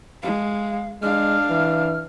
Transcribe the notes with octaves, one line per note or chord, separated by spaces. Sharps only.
G#3 F5
G#3 D4 F5 F6
E3